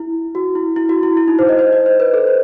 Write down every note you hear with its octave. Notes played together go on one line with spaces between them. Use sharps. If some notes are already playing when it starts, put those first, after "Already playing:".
Already playing: E4
F#4
E4
E4
F#4
E4
E4
D#4
C5
D#5
C5
D#5
C5
B4
A4
C5